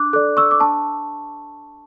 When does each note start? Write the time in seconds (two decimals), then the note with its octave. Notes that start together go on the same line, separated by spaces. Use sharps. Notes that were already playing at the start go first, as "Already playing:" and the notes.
Already playing: D4 D6 F#6
0.13 A4 D5 D6 F#6
0.37 C#6 E6
0.51 D6
0.60 D4 A5 C#6